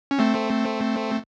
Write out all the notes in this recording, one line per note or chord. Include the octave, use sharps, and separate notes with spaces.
C#4
A3 C4